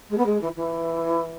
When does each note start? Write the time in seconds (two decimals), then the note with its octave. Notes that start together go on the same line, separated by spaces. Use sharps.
0.09 G#3
0.17 B3
0.25 G#3
0.41 E3
0.56 E3